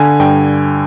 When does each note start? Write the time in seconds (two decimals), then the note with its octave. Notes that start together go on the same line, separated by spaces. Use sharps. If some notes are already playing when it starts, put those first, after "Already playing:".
Already playing: D3 G#5
0.20 G2 G5